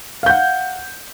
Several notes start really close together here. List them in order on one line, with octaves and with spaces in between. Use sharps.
F5 G6 F#5